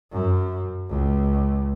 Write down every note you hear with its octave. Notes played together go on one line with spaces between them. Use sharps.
F#2
C#2